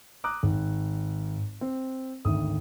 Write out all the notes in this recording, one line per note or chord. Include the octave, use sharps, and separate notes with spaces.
A#5 D6 D#6 F#6
G#1
C4
G#1 D2 D#6